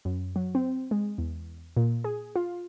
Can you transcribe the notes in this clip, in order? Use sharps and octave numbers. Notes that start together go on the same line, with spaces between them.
F#2
F#3
C4
G#3
E2
A#2
G#4
F4